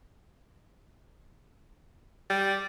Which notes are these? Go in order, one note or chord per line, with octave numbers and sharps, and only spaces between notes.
G3